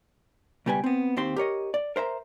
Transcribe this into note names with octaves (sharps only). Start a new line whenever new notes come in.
C#2 B2 G3 G4 B4 G#5
B3 C4
D#2 D#3 C4 G4 C6
G4 A#4 C#5 D#5
D5
A#4 C5 E5 A#5